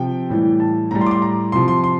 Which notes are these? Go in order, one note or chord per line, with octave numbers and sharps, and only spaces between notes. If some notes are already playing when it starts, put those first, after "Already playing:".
Already playing: C3 F3 G5
A2 E3 G3
A5
A2 G3 A#5
C6
D6
C6
A#5
C3 F3 C6
C6
C6